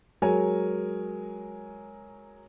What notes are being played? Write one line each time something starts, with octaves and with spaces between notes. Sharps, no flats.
F#3 G#3 A#4 C#5 G#5